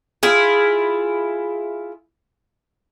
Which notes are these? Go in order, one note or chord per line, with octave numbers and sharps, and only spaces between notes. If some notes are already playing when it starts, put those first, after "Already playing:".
E4 F4 G#4